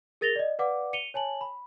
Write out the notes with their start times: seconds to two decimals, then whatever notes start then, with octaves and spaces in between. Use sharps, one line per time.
0.21 G#4 A#4 A6 A#6 F7 G7
0.36 D5 D#5
0.59 B4 D5 F5 F#5 D6
0.93 C#7 D#7 F7 G7
1.14 C#5 G#5 A5 F#7
1.41 B5